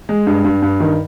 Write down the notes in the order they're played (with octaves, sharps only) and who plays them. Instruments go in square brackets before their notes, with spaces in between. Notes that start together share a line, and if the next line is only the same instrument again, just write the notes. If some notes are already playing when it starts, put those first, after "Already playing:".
[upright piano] G#3
G2
G2
G2
D#3